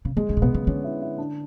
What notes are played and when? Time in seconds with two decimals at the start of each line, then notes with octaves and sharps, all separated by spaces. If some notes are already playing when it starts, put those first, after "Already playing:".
0.05 C#3
0.17 D3 G#3
0.29 C#3
0.37 A2
0.42 B2 B3
0.55 C#3
0.67 D3 C#4
0.84 E4
1.02 E4
1.18 D4